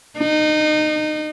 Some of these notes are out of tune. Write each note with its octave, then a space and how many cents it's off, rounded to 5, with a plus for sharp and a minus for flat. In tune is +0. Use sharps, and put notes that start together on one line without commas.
D#4 -25